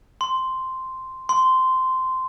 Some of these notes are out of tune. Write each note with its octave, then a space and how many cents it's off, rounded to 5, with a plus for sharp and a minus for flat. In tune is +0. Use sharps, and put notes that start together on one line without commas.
C6 -5
C6 -15